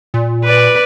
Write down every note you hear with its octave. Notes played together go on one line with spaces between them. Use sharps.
A#2
B4 D5